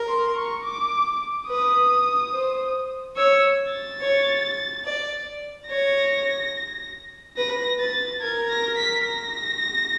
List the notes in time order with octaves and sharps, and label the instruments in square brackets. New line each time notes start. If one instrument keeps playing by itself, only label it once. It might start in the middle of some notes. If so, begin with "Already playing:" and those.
Already playing: [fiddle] A#4
[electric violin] C6
C#6
D6
[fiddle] B4 [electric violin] D#6
[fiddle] C5
[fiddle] C#5 [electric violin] E6
[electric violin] A6
[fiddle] C#5
D5
[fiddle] C#5 [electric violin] A#6
[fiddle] B4 [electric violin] A#6
[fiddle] B4 [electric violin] A6
[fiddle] A#4 [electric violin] G#6
[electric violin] A#6
B6
A#6